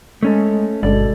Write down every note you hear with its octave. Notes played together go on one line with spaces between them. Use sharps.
G#3 A3 C#4 A4
G1 B2 G#3 A4 D5